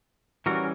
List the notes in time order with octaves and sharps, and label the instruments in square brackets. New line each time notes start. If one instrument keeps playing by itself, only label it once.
[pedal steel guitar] E3 G3 C#4 F#4 A#4